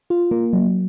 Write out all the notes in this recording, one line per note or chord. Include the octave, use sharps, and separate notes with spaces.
F4
A#3
F#3